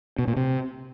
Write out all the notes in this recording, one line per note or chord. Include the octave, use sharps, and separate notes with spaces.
B2
A#2
C3